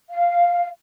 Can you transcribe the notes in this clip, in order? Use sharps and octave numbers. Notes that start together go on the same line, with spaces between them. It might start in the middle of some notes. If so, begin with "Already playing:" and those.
F5